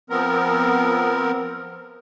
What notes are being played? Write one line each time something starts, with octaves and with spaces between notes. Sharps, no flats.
F3 B3 C4 A#4